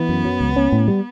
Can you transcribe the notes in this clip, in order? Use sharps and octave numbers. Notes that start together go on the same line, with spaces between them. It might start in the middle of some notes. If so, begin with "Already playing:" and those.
Already playing: E3 B3
F#2
F#3
C#2
C#4
A2
G3